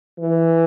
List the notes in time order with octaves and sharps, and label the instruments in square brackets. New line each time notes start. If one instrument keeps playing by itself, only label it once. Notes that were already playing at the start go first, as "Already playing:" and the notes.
[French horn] E3